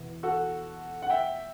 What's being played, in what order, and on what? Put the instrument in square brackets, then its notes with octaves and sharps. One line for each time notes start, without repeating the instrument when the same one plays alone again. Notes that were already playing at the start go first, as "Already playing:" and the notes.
Already playing: [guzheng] E2 B2
[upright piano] F#4 A4
F#5
E5 G5